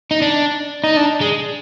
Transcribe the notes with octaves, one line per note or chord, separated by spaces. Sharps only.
D#4
D4
D#4
D4
G#3